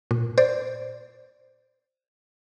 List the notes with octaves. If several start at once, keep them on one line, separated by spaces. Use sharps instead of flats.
A#2
C5 D5